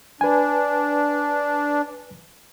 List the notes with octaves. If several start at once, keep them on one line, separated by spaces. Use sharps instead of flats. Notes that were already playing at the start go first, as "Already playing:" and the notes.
D4 B4 G#5